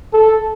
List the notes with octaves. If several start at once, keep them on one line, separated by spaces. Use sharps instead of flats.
A4